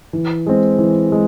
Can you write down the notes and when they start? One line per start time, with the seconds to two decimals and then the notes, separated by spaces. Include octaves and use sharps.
0.13 E3
0.46 G#3 C4
0.78 E3
1.12 G#3